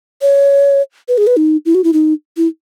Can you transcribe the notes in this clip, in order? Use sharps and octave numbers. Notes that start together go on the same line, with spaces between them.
C#5
B4
G#4
B4
D#4
E4
F#4
E4
D#4
E4